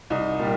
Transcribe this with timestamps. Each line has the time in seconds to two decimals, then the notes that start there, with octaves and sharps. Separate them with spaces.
0.10 C2 D#4
0.39 A#2 G3